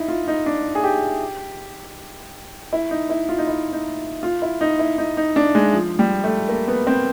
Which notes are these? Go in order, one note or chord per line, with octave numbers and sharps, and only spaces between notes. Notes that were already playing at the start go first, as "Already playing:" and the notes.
Already playing: D#4 E4
F4
D#4
D4
G#4
G4
E4
D#4
E4
F4
D#4
E4
D#4
F4
E4
D#4
E4
D#4
D#4
D4
G#3
F3
G3
A3
A#3
B3
C4